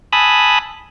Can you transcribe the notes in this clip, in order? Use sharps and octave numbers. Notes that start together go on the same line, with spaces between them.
G#5 A5 B5 D#6 E6 F#6